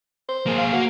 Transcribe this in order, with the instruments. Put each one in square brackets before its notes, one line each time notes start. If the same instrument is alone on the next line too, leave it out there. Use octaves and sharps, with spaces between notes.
[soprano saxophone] C5
[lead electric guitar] A#3 G#4
[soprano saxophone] F5
[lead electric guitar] A#3 [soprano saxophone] F#4